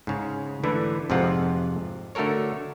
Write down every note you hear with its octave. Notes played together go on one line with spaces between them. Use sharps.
G#2 C#3
D3 E3 A3 E4 A4 B4
F2 G#2 C3 F3 F4 F#5
D3 A3 F#4 A4 A#4 C#5